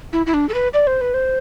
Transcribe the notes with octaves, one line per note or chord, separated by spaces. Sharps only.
E4
E4
D4
A4
B4
D5
C5
B4
C5